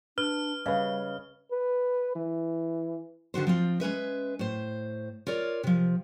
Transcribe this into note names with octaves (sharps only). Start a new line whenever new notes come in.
D4 B4 F6
C#3 G3 B4 D#5
B4
E3
D3 D#3 F#4 C5
F3 C4 F4
G#3 C#4 B4 E5
A2 C5
F4 A#4 C#5 D5
C3 F3